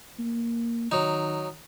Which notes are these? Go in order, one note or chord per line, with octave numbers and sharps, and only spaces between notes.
A#3
D#3 F#3 D#4